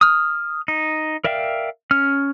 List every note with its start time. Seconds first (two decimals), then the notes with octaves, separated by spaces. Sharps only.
0.01 D#6 F6
0.68 D#4
1.24 A#4 D5 E5 F5 G5
1.91 C#4 F6